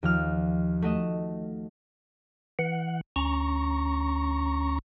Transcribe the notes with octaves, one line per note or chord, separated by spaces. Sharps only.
D#2 F3 F6
A3 F#4 D#5 E7
E3 F#5
D2 C#4 A#5 C#6